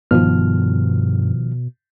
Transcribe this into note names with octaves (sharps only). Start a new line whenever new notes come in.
G2 B2 D#3 F3 B3 F6